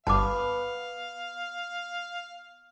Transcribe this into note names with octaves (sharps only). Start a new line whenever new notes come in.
G1 G2 B3 F5 A5 D6